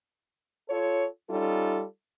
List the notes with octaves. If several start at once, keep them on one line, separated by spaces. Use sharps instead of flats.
F4 A4 C#5
G3 C#4 D#4 F4 A4